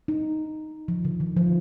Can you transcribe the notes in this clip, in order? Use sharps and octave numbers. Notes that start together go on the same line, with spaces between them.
D#4
F3
D3
D#3
F3